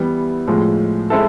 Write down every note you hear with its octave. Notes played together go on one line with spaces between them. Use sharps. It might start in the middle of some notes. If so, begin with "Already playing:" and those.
Already playing: E3 G3 B3
A2 F3 G#3
G#3 C4 E4 A4